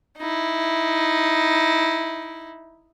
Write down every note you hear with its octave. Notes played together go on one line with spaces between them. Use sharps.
D#4 E4